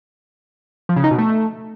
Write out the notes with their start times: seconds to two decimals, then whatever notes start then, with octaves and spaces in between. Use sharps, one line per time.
0.89 F3
0.96 C#3
1.04 D#4
1.11 B2
1.18 A3